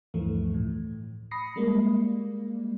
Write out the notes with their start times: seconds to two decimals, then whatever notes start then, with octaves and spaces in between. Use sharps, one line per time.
0.14 D2 G2 E3 F3 A3
0.54 A2
1.31 B5 D#6 A#6 C7 C#7
1.56 G3 G#3 A#3